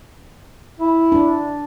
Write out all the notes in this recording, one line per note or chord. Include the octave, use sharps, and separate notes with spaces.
E4
D4